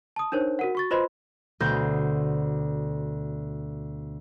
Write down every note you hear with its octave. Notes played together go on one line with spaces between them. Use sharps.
A5 D#6
D4 D#4 A#4 C5 C#5
F#4 A#4 F#5
F#4 C#6 A6
F4 B4 C5 D#5 B5 C6
D2 B2 C5 G6 A#6